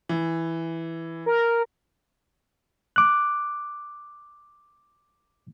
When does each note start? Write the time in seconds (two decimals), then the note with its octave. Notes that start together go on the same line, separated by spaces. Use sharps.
0.09 E3
1.26 A#4
2.96 D6 F#6